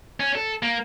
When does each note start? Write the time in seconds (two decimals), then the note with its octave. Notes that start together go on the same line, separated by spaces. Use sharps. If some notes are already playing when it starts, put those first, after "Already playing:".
0.20 C#4
0.35 A4
0.63 A#3